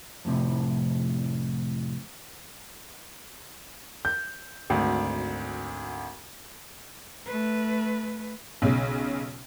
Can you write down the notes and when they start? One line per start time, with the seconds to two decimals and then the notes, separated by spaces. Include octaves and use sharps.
0.25 F2 A2 C3
4.05 G6
4.70 G#1 D2
7.26 A3 B4
8.62 B1 C#3